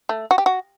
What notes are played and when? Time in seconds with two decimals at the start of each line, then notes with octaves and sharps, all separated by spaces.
0.09 A3
0.31 F#4
0.38 G4
0.46 F#4